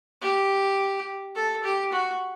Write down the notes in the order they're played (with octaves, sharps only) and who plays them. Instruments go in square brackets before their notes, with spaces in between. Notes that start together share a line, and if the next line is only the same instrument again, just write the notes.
[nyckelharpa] G4
A4
G4
F#4